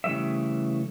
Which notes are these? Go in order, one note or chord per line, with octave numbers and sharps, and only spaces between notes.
C#3 E3 G3 A3 E5